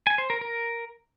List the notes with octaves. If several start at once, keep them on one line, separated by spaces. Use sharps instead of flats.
G#5
C5
A#4
A#4